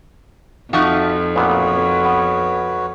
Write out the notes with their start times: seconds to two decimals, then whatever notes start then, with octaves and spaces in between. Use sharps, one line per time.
0.73 F2 F3 D#4 F#4 E5 A5
1.36 A1 A#2 B3 F#4 B4 C#5
2.05 B3